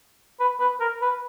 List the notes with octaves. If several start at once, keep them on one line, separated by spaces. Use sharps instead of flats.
B4
B4
A#4
B4